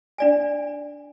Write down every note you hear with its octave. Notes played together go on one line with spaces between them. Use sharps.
D4 D5 G#5